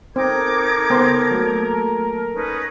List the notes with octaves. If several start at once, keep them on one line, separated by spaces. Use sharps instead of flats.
C4 D#4 A4 A#4 C5 D6 G#6
C#3 B3 C5
F#3 A3 A#3
C#4 D#4 B4